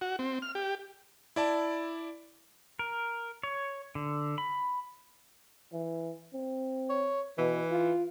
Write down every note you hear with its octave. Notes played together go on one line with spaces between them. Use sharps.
F#4
C4
F6
G4
E4 D5 A5
A#4
C#5
D3
B5
E3
C4
C#5
B2 E3
F4